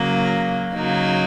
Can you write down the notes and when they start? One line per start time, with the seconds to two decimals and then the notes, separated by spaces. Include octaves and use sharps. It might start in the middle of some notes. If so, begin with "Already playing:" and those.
Already playing: C#3 F#3 A#3
0.74 C#3 F#3 A#3 D#4